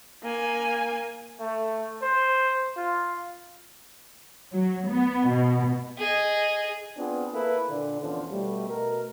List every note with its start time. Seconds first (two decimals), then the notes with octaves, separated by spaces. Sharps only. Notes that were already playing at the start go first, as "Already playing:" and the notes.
0.23 A#3 G#5
1.40 A3
2.02 C5
2.77 F4
4.53 F#3
4.88 B3
5.27 B2
5.97 G#4 D#5
6.97 B3 C4 D4 F4 G#4
7.33 A#3 E4 A4 B4
7.69 A#2 D3 D4
8.00 E2 A#2 D3 E3 F3 C#4
8.31 B2 G3 A3
8.68 B2 A3 A#4